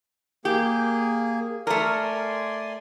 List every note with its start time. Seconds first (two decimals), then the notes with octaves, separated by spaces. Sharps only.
0.45 A#3 G4 G#4
1.67 A3 A#4 D5 G#5 C6